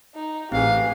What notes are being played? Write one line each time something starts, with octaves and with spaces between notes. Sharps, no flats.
D#4
A1 C4 G4 G#4 F5